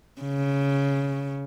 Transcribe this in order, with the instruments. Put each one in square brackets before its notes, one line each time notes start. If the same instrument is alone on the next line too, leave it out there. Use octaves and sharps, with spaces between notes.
[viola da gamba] C#3